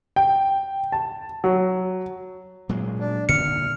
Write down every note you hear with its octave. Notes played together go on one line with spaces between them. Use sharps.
G5
A5
F#3
A#2 F#3 G#3
D4
A#2 D3 D#3 F6 C#7